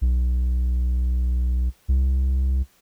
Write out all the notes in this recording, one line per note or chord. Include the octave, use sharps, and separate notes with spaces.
B1
C2